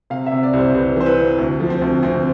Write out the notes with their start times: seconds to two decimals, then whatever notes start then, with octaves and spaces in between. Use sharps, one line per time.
0.10 C3 F5
0.26 E5
0.32 C3
0.43 D5
0.53 C2
0.58 C5
0.75 C2 B4
0.96 E3 C5
1.06 B4
1.17 C3
1.38 D2
1.60 F3
1.70 C4
1.82 D2
2.03 D2 C4